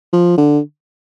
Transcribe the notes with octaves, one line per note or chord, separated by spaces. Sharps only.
F3
D3